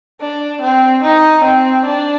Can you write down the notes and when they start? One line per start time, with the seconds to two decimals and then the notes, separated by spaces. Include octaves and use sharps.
0.21 D4
0.62 C4
1.03 D#4
1.44 C4
1.86 D4